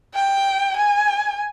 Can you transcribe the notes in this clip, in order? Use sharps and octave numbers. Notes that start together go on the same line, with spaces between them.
G5
G#5